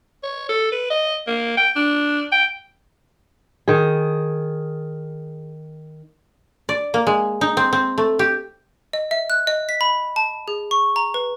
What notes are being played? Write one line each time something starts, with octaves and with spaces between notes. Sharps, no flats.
C#5
A4
B4
D#5
A#3
G5
D4
G5
D#3 G#4
D5
A#3
G#3
D#4
C4
C4
A3
G4
D#5
E5
F#6
D#5
B6
B5
A5
G#4
C#6
A#5
B4